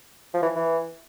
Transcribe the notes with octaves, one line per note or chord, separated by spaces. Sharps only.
F3
E3
E3